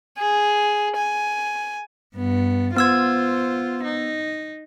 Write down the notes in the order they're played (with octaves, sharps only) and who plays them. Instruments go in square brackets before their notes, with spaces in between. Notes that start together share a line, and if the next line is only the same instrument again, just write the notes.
[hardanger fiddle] G#4
G#5
[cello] G2 B3
[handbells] B3 E6 G#6 [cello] F4 C5
[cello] D#4